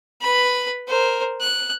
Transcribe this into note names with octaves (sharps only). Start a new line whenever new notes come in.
B4 B5
A#4 C5
F#6